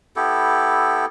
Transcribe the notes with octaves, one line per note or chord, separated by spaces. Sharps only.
B3 E4 G4 A4